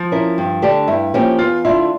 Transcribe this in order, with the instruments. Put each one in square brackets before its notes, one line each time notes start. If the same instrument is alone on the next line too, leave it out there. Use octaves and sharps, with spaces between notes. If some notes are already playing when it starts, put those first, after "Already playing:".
Already playing: [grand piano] F3
[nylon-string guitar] C#4 E4 A#4
G2
D3 A3 D4 G4
[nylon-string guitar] G2 [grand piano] E4
[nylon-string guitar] F3 A#3 C#4 G4
[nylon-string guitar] E2 [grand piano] F4
[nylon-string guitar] D3 A3 D4 F4 [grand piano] E4